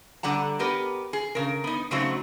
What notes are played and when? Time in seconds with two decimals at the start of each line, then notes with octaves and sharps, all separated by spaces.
0.23 D3 G3 F#5 A#5
0.59 B3 G4 A#4 B4
1.13 G#4
1.35 C#3 A#4
1.64 B3 D#4
1.91 C#3 F#3 A3 C4 D#4 F#4